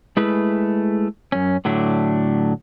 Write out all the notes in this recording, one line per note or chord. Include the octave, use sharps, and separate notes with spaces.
G#3 A3 E4 G#4 B4
F#2 C#4
A2 D3 F#3 A3 D4